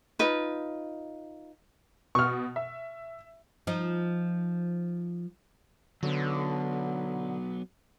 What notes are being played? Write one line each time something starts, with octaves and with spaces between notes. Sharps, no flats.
D#4 F4 B4
B2 C#6 F6
E5
F3 D#4
D3 F#3 B3